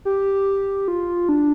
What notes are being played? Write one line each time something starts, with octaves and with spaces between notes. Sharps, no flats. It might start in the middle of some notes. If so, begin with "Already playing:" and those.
G4
F4
D4